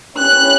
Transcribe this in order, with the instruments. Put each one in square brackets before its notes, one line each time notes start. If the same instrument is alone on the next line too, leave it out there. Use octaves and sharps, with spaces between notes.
[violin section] C#4 E4 G4 F#6